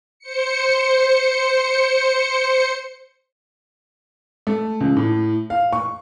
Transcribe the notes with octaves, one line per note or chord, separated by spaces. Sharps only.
C5 C#7
A3
C#2
A2
F5
C#6